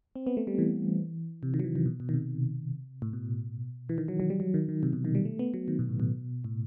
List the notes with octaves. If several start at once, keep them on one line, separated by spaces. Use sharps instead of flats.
C4
B3
A3
G3
E3
C3
D#3
F#3
E3
D#3
B2
B2
D#3
C3
A2
B2
E3
D#3
F#3
F#3
G3
F#3
D#3
D#3
C3
B2
D#3
G3
A3
B3
F#3
D#3
B2
A2
B2
A2